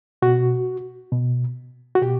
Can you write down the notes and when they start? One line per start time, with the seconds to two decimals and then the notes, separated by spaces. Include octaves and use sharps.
0.22 B2 F#4
1.12 B2
1.95 F#4
2.01 B2 G4